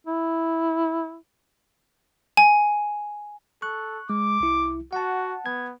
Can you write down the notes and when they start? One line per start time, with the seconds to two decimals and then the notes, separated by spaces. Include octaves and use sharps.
0.07 E4
2.37 G#5
3.62 A4 C#6 F#6
4.10 G#3 D6
4.40 C2 E4
4.93 F#4 F#5 A5
5.46 B3 G#6